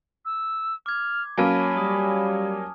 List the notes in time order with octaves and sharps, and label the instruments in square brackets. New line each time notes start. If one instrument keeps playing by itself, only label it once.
[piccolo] E6
[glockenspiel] D6 G#6 [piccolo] F6
[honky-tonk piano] F#3 A#3 C#4 [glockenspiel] G#5 A5 F6 [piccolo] B5
[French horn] G3 [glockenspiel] D#6